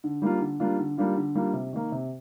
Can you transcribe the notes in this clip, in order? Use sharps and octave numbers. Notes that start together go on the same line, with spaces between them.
D3
G3 A#3 D4 F4
D3
G3 A#3 D4 F4
D3
G3 A#3 D4 F4
D3
G3 A#3 D4 F4
C3
D#3 A#3
C3